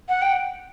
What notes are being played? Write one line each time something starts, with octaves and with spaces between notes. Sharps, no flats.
F#5
G5